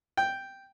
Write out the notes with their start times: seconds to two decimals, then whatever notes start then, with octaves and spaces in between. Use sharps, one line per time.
0.17 G5